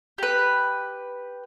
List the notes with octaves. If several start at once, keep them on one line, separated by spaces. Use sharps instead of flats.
G4 B4